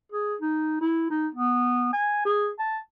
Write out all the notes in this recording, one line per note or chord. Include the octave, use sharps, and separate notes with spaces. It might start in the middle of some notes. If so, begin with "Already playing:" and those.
G#4
D#4
E4
D#4
B3
G#5
G#4
A5